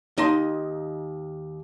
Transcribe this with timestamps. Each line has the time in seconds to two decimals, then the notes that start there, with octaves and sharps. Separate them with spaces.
0.18 D#2 D#4 A5 C6